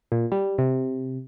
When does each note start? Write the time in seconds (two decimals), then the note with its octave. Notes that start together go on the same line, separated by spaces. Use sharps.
0.12 A#2
0.32 G3
0.58 C3